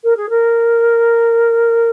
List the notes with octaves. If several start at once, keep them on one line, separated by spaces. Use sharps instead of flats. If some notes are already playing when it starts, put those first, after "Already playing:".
A#4
G#4
A#4